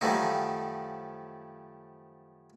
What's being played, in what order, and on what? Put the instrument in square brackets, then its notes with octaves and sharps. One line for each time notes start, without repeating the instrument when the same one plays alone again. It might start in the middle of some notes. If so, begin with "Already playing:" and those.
[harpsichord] F#2 D#3 F3 G3 A3 D#4